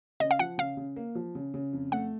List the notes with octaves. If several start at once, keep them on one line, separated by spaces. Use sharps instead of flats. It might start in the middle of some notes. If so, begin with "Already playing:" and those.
C#3 D#5
F5
F3 F#5
C#3 F5
C#3
A#3
F3
C#3
C#3
F2
A3 F#5